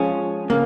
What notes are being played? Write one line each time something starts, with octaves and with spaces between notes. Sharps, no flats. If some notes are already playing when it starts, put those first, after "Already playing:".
Already playing: F3 G#3 C#4 F4 G#4 C#5
C#3 A#3